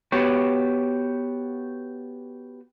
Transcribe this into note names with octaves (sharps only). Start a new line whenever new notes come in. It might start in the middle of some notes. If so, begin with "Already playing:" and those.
B3 F#4 G4 C#5